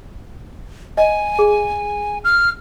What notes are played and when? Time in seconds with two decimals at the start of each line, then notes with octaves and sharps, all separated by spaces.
0.97 D#5 G#5
1.39 G#4
2.24 F6